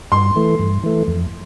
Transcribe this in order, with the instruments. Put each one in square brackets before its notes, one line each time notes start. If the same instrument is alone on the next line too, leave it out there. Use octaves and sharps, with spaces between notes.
[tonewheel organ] G2 [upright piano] C6
[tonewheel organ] E3 A3
G2
E3 A3
F2